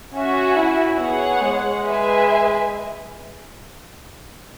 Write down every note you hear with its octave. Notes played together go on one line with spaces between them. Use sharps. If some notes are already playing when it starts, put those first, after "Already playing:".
C#4 F#4 E5 G#5
E4
B3 G#4 C#5 F#5
G#3
G#4 B4 E5 G#5